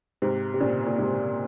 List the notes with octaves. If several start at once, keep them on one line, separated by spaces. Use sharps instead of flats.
G#2 C3
C3
A#2 C#3
A#2
G#2 C3